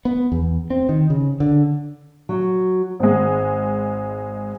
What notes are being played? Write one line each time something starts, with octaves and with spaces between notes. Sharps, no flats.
B3
E2
C4
D#3
C#3
D3
F#3
G#1 G#3